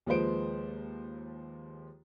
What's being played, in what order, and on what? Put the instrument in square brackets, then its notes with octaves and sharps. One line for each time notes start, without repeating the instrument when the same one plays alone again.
[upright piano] D#2 F3 G#3 B4 C5 D7